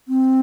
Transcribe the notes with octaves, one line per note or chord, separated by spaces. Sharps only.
C4